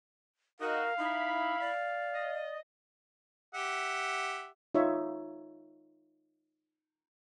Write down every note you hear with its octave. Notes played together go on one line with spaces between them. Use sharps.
D#4 F#4 A#4 F5
D#4 E4 B5
D5
D#5
G4 E5 F#5
D#4 F4 C#5 E5